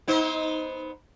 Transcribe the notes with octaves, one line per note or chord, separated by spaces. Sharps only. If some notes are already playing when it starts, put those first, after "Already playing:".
B3 D#4 C5